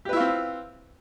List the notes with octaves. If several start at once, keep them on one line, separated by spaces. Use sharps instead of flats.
C4 E4 F4 G4 B4